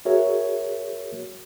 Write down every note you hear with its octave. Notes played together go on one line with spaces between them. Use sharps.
F#4 G#4 A#4 C#5 E5